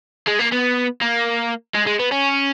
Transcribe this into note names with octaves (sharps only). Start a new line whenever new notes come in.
G#3
A#3
B3
A#3
G#3
G#3
B3
C#4